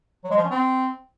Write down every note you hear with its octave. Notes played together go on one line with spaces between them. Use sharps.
F#3
G#3
F3
C#4
C4